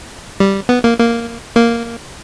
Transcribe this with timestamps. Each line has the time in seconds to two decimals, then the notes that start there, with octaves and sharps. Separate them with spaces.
0.40 G3
0.69 B3
0.84 A#3
0.99 A#3
1.56 A#3